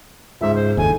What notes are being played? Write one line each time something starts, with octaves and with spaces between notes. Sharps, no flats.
C#2 G#2 E5
C5
F#1 D#2 D#4 A4 G#5